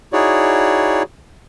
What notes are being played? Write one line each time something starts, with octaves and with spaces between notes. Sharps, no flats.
D#4 E4 F#4 G#4 C#5 D5